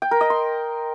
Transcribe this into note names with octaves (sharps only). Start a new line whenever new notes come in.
G5
A#4
D#5
C6